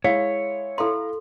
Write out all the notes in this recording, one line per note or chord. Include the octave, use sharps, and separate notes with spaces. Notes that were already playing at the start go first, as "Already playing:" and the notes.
G#3 E4 C#5 E5 F5
E4 A4 F5 A#5 C6